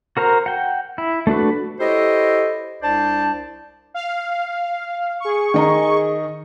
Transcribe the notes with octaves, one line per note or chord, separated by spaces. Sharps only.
F#4 A#4 C5 A#5
F#5 G5
E4
A3 D4 F#4 B4
E4 G4 A4 C5 C#5 D#5
C2 D4 C5 D5 A5
F5
G#4 C#6
D#3 D#5 A#5